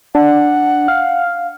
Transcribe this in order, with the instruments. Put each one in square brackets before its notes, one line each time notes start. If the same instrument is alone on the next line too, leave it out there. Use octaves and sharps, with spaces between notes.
[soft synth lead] D4 [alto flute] F#5
[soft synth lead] F5